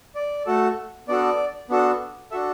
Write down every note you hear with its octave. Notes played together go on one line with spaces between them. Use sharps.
D5
A3 F#4 A4
B3 D4 F#4 A4 D5
B3 D4 F#4 A4
D4 F#4 A4 E5